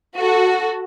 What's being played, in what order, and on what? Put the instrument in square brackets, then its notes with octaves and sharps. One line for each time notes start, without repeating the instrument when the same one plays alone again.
[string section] F#4 A4